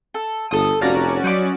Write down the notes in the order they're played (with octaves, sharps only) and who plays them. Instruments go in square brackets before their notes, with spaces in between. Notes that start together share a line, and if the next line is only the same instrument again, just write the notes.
[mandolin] A4
[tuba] G1 [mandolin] A4 D#6
[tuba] F1 [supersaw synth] C#4 F#4 D5 [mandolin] F5 A5 A#5
[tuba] F#3 [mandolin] D#4 B4 D6